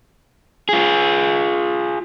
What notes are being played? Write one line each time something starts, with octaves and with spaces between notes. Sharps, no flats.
F4 G#4